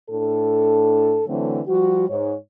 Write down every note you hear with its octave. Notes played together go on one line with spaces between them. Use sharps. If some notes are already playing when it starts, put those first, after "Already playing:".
A2 D4 A4
D3 E3 F#3 A3 C4
F3 G3 F#4
G#2 C#5